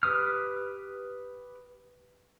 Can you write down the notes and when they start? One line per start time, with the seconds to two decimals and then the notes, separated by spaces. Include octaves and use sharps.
0.03 G4 B4 D#6 F6